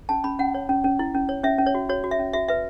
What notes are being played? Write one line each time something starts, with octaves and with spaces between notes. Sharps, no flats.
C#4 A5
C#4 B5
C#4 F#5
C#5
C#4
C#4
E4
C#4
C#5
C#4 E5
C#4
C#5
F#4
F#4 C#5
F#4
E5
C#4
F#4 E5
B4 E5